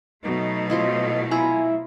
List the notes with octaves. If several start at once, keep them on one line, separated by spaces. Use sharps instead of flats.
B2 F#3 A3 D#4
E4 F4 C5 D#5
E4 F4 G#5 A#5 B5